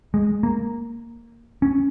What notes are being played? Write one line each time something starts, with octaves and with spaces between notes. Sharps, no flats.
G#3
A#3
C#4